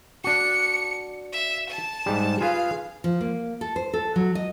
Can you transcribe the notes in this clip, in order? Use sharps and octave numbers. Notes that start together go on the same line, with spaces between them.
D4 F#4 C#7
E5
A5
G#2 G3
F4 G#4 B4 F5
F3
A#3
A4
C5
A4
F#3
D#5